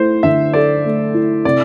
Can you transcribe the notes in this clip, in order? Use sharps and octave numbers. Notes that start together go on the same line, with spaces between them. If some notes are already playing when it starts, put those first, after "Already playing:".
Already playing: A3 E4 C5
D3 E5
A4 D5
A3
E4
C3 D5